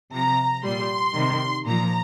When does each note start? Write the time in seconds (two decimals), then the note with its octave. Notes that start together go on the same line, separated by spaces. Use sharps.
0.12 C3 F3 A#5
0.64 A#2 G3 C6
1.15 C3 D#3 G3
1.66 A#2 F3 A#5